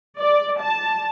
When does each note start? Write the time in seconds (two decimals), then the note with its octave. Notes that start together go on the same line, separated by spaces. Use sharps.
0.18 D5
0.60 A5